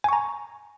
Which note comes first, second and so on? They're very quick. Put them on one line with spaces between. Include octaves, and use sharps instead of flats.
G#5 C#6 A#5